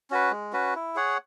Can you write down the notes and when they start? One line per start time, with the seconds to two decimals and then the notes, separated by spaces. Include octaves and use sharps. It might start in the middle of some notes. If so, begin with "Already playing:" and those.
0.10 C#4 F#4 B4
0.31 G#3
0.53 C#4 F#4 B4
0.75 E4
0.95 G#4 C#5 F#5